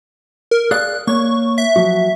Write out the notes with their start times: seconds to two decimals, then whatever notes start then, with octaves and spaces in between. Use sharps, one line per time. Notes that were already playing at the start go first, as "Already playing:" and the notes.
0.51 A#4
0.71 G#4 D5 F5 F#6
1.07 A#3 C#5 C#6
1.58 E5
1.76 F3 F#3 F#4